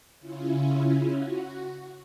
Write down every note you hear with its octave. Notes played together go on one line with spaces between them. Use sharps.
C#3 C#4 E4 F4
F#4